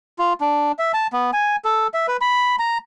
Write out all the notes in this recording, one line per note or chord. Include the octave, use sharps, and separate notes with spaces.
F4
D4
E5
A5
B3
G#5
A4
E5
B4
B5
A#5